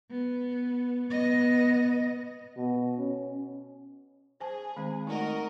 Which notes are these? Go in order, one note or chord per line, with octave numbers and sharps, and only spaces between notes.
B3
B3 D#5
B2
C#4
G#4 C5 G#5 A5
D#3 G#3 C4
A3 D#4 F#4 A#4 D#5